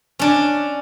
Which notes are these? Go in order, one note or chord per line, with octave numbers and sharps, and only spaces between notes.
C#4 D4